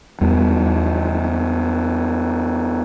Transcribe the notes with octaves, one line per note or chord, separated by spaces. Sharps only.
E2 G3